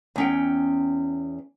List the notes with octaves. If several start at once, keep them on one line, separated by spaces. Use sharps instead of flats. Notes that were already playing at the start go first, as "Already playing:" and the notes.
E2 C#4 G5